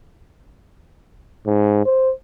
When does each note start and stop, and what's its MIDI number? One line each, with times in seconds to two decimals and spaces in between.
1.46 1.82 44
1.85 2.11 72